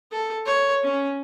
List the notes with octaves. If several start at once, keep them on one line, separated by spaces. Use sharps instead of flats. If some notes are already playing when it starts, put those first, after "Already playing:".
A4
C#5
C#4